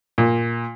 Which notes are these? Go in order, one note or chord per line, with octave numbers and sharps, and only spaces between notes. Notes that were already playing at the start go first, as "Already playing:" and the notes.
A#2